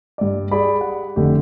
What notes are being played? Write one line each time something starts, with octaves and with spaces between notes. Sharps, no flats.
G2 D5
G4 G#4 D5 B5
F#5
F1 D3 A3 G4